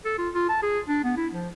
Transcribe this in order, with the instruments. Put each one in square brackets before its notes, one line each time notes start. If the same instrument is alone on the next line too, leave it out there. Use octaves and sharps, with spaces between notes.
[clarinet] A4
F4
F4
A5
G#4
D4
B3
E4
F3